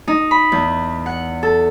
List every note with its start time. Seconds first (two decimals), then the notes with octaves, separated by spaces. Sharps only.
0.08 D#4
0.31 B5
0.52 E2
1.06 F#5
1.43 A4